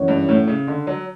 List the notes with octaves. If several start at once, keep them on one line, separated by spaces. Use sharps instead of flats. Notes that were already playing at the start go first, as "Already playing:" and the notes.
Already playing: F#2 E3 B3 F#4 C#5
G2
A2
C#3
D3
F#3